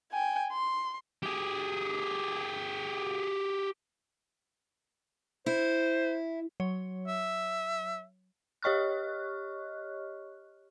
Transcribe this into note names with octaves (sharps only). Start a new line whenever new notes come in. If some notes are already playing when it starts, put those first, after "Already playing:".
G5 G#5
C6
G4 G#4
E4 C5
F#3 C#5
E5
G4 C#5 D#5 C#6 F6 F#6